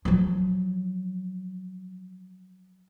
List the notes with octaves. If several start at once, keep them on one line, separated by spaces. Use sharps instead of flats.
F3 F#3